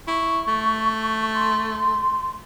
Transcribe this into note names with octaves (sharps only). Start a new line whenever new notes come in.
E4 C#6
A3
C6